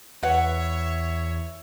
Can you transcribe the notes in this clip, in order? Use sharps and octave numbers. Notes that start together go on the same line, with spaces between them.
E2 B4 C#5 E5 F#5